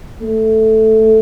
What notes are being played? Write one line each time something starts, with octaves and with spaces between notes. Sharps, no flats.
A3